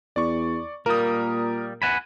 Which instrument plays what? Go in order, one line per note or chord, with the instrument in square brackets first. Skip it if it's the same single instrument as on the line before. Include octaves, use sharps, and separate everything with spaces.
[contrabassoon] E2 [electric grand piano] D5 C#6
[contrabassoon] A#2 [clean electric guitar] G3 A#3 [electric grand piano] A#4 D#6
[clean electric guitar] F#5 G#5 B5